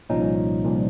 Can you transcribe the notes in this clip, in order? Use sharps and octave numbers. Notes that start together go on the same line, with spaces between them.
C2 A#2 F3 C#4 D#4
C2 A#2 F3